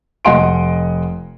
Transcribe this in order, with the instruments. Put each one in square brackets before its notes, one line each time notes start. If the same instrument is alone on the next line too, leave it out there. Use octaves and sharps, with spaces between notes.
[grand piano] F1 D#5 F#5 C6 D7